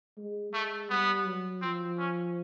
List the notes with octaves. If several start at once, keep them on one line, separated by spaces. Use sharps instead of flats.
G#3
G#3 A3
G3 B3
F#3
F3 C4
C#4